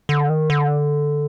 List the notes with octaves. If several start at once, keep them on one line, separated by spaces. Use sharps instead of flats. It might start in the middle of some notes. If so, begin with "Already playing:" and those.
D3
D#3
D3